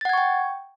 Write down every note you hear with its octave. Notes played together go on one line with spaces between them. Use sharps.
F#5 G5 C#6 G#6 A6